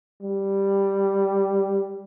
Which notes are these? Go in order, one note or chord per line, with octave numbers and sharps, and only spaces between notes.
G3